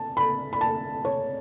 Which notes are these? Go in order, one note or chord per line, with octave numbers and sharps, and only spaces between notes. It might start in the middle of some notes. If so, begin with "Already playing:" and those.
Already playing: A5
B5
B5
A5
C#5